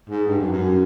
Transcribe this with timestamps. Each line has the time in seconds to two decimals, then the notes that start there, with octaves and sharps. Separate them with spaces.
0.10 G#2
0.28 G2
0.40 F#2
0.53 F#2